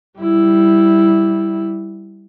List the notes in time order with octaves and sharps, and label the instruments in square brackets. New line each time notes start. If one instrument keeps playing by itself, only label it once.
[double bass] G3 E4